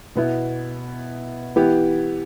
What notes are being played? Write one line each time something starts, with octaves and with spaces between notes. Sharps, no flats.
B2 B3 E4
E3 B3 E4 G4